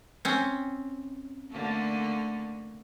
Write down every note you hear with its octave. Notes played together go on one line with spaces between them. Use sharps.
C4 C#4
D3 A3 A#3